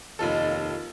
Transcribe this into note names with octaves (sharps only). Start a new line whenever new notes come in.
F1 D#2 F4 A4 D#5